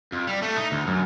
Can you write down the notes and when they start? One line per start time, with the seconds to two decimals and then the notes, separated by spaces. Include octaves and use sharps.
0.13 F2
0.27 G3
0.42 A3
0.57 D#4
0.72 D2
0.87 F#2